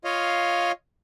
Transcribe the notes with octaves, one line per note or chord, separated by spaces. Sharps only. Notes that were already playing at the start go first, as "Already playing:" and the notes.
F4 C#5 D#5 F5